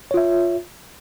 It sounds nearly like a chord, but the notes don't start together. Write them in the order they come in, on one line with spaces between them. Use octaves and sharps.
C#5 F4 E5